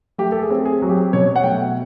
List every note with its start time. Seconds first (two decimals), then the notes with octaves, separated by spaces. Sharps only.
0.18 A3 G4
0.32 A4
0.42 G#4
0.50 C4
0.65 G#4
0.82 F#3
0.89 G4
1.13 B2 C#5
1.36 F#5
1.44 A3 G5